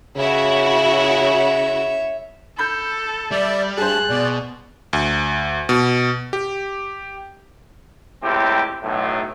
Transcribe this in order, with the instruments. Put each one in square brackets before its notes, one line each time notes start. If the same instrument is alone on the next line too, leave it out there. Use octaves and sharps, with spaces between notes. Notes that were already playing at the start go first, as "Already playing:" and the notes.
[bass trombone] C#3 [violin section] E4 F#4 [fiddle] C#5 E5
[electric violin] A4 [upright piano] B5 G6
[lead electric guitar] G3 [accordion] D5 E5
[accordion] G2 A5 [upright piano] G#4 C5 [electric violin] F#6
[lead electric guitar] B2 [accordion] D5
[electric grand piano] D2
B2
G4
[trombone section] C#2 A2 C4 E4 G4
B1 A2